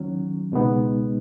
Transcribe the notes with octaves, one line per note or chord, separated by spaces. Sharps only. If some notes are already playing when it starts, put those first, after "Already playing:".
Already playing: D#2 D#3 F#3 C#4
C#2 B2 G#3 B3 D#4